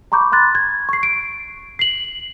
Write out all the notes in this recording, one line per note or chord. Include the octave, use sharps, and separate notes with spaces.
A#5 B5 C#6 D6 G6
B5 C6 F#6 A6
G#6
C#6 C7
D7
C7 F#7